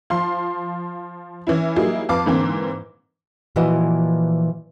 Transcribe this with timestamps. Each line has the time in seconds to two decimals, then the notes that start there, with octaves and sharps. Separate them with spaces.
0.10 F3 F5 C6
1.47 E3 C#4 E4
1.76 F#3 G3 A#3 D#4 E4 G#4
2.09 F2 B4 F5 A5 D6
2.26 G#2 D3 E3 A#3 C4
3.56 A#2 E3 F3 E4 F#4 D#5